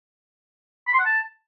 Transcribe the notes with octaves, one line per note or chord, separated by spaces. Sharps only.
B5
C6
F#5
A5